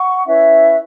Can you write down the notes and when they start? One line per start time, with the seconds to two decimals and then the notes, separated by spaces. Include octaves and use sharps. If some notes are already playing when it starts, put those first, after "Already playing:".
Already playing: F#5 C#6
0.26 C#4 E4 B4 E5